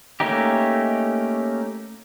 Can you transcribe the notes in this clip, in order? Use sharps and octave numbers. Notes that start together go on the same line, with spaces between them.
A3 A#3 C#4 D#4 G4